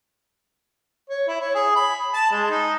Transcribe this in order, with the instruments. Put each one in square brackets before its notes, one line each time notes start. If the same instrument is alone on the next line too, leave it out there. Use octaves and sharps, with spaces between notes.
[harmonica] C#5
E4
C#5
G#4
B5
A5
G#3
D#4